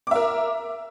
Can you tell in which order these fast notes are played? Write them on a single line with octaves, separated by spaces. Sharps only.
D6 E5 A#4